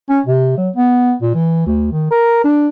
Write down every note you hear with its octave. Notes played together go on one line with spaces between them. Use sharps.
C#4
C3
F#3
B3
A#2
E3
D2
D#3
A#4
D4